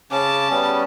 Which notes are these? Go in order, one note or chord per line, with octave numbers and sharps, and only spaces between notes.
C#3 C#4 A5 D6
G3 B3 C#4